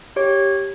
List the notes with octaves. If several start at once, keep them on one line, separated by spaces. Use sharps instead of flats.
G4 C#5